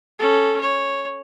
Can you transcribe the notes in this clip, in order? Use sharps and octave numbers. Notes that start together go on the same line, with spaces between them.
C#4 A4
C#5